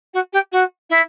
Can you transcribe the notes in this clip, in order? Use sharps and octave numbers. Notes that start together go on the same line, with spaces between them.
F#4
G4
F#4
E4